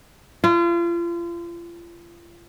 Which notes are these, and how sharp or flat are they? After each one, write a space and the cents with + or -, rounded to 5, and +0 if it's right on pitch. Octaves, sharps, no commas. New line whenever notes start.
F4 -35